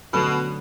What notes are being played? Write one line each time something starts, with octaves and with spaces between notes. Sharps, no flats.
B2 D3 F#3 A3